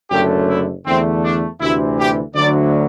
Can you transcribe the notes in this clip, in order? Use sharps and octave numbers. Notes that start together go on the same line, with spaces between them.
F#1 F#2 D3 A3 G4
E4
E2 D3 A3 C4
D4
D2 C3 E3 E4
G4
D2 D3 F#3 D5